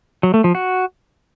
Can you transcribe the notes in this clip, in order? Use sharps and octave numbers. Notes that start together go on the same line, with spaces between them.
F#3
A3
F3
F#4